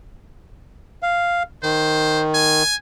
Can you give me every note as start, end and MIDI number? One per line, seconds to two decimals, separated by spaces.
1.02 1.43 77
1.63 2.63 51
1.63 2.24 72
2.34 2.75 80